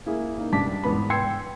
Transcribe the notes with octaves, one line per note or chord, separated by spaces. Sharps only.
A#3 E4 G#4
A#3 D#4
G2 D4 A5 D6 B6
E2 G#2 B3 B5
G5 C6 E6 G#6 C7 C#7